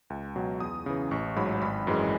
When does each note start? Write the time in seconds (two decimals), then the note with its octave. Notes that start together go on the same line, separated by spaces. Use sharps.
0.10 C#2
0.36 B2 F#3
0.60 E2 D#6
0.86 C#3 E3
1.11 A1 C#6
1.36 G#2 F#3 B5
1.62 G#1 B5
1.87 F#2 E3 G#3